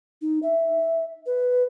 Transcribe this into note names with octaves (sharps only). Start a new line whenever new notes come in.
D#4
E5
B4